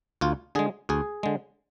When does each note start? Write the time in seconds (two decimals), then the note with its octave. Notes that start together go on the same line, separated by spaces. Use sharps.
0.21 D2 F4
0.55 D3 G#3 G#4
0.89 D2 G#4
1.23 D3 G#3